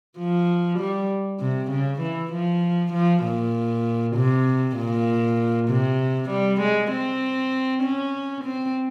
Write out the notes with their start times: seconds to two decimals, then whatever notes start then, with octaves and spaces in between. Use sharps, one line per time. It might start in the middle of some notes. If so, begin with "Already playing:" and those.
0.18 F3
0.80 G3
1.40 C3
1.71 C#3
2.02 E3
2.33 F3
2.93 F3
3.24 A#2
4.16 C3
4.77 A#2
5.69 C3
6.30 G3
6.61 G#3
6.91 C4
7.83 C#4
8.45 C4